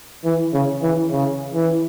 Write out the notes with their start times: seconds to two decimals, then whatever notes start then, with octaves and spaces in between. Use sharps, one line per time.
0.25 E3
0.53 C#3
0.82 E3
1.11 C#3
1.54 E3